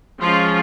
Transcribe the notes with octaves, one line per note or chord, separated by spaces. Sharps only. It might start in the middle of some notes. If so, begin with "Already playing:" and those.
F3 G#3 C#4 F4